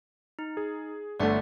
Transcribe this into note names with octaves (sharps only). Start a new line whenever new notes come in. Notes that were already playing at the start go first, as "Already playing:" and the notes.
D#4
G#4
G1 D3 A3 D5 E5 F#5